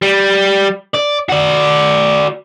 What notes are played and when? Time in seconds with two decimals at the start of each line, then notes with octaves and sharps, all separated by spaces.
0.02 G3
0.94 D5
1.29 F#4 D5